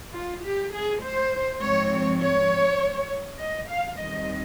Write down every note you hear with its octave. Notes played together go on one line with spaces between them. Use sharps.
F4
G4
G#4
C5
G#2 F3 G#3 C4 C#5
C#5
D#5
F5
D#2 D#3 G3 C4 D#5